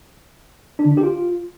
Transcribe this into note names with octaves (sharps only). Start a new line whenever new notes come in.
D4
D3
D4
G4
F4